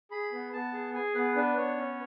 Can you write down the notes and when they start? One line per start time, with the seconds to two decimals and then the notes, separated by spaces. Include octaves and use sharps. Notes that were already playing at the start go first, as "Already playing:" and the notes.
0.11 G#4 B5
0.32 B3
0.53 B3 A5
0.73 G#4
0.94 G#4 G#5
1.15 B3 B4
1.36 D4 B4
1.57 B3 C#5
1.78 C#4